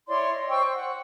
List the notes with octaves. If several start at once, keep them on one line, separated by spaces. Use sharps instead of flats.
E4 C#5 D5 C6
D#5
C5 G5 C#6 E6
C5
F#5